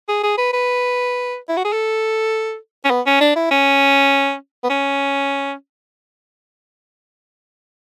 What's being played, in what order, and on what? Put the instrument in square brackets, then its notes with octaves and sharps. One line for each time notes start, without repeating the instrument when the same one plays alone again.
[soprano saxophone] G#4
G#4
B4
B4
E4
F#4
G#4
A4
C#4
B3
C#4
D4
E4
C#4
B3
C#4